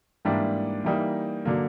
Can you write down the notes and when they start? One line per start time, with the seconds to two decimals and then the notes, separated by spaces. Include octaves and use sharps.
0.25 G#2 E3 G3 A#3 D4
0.84 E3 G3 A#3 D#4
1.45 D3 F#3 A#3